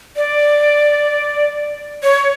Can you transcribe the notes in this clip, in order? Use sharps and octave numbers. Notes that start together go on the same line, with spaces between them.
D5
C#5